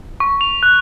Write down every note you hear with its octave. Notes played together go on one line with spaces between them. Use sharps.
C#6
F7
F#6